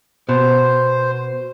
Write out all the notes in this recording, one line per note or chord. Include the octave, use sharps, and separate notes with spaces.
B2 C5